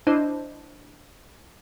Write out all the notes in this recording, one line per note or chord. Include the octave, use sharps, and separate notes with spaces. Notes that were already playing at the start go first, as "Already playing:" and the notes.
D4 E4 C5 D#5